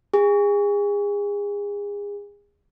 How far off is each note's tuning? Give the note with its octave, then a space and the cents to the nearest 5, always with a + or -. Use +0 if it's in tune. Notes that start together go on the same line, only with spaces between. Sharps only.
G#4 -30